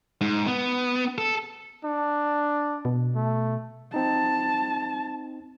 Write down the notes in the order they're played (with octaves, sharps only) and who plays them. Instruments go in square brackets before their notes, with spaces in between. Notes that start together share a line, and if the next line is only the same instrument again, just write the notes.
[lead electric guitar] G#2
B3
A4
[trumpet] D4
[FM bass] B2
[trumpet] A3
[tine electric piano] C4 D#4 [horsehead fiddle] A5